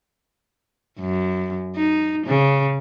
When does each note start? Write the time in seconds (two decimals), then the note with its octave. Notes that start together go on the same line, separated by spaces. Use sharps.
1.00 F#2
1.76 D#4
2.27 C#3